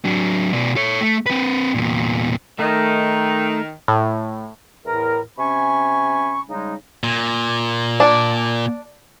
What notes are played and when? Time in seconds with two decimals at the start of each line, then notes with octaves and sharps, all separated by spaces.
0.05 F#3 D4
0.53 B2 D5
0.76 A4 C#5
1.01 A3
1.26 C4 B4
1.75 E2 A#2
2.59 D#3 A3 D#4
3.88 A2
4.85 E2 A2 A#4
5.38 C3 C#4 G#5 B5 C#6
6.48 C#3 G3 G#3 D#4
7.04 A#2
8.00 D4